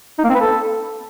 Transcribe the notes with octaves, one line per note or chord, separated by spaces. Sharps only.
D#4
A#3
C4
B4
A4